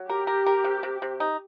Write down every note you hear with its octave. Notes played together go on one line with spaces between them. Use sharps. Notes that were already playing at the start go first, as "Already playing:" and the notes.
Already playing: F#3
G4 A#4
A#4
A#4
C3
C3
C3
D#4